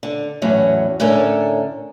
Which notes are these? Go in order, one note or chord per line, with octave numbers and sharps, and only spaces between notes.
D3
E2 A2 F#3 C#4
A2 D3 C#4 A4 A#4